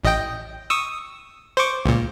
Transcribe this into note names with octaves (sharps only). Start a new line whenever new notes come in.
A1 D#5 G5
C#6 D#6 E6
C5 C#6 D6
C#2 A#2